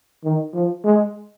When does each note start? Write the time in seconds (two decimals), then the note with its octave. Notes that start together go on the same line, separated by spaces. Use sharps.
0.24 D#3
0.54 F3
0.85 G#3